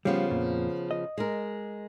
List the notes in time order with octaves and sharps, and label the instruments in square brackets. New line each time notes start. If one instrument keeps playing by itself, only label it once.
[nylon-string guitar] C#3 F3 B3 [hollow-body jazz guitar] G3
[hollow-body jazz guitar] F2 A#2
D#5
[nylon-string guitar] G#3 A#4